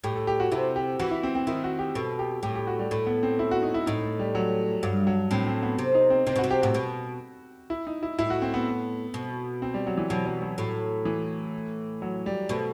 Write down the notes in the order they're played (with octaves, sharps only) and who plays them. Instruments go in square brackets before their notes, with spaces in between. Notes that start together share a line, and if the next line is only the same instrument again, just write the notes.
[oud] A2 [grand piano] G4
[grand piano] A4
G4
F#4
[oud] C3 [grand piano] E4
[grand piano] G4
[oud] E3 [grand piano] F#4
[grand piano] E4
C4
C4
[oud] D#3 [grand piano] E4
[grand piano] F#4
G4
[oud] B2 [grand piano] A4
[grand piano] G4
[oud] A2 [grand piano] G4
[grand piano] G4
F#4
G3
[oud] A2 [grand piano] A3
[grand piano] B3
C4
E4
F#4
D#4
E4
[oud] A2 [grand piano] D#4
[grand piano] A3
G3
F#3
[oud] G2 [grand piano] F#3
[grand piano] F#3
[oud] A2 [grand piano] C4
[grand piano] C4
B3
[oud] C3
[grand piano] D#4
C4
[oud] C3 [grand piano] C4
[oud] B2
[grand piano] F#4
[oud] C3
[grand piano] G4
[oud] A2 [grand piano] F#4
[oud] B2
[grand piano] E4
D#4
E4
[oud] A2 [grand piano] E4
[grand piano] F#4
C4
B3
[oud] B2
[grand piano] C4
G3
F#3
E3
[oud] B2 [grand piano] F#3
[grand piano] F#3
F#3
[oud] A2
[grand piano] E3
F#3
G3
[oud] B2 [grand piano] A3